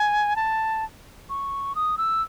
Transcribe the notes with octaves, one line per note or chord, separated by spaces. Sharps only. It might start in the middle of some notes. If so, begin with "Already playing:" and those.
Already playing: G#5
A5
C#6
D#6
E6